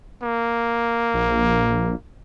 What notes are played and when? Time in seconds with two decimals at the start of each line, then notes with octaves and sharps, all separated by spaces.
0.23 A#3
1.14 A#1